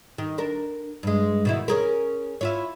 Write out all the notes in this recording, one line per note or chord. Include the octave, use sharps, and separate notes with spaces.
D#3
D4 A#4
G2 G#3
B2 D#3 E4
C#4 G#4 A#4
E4 F4 C#5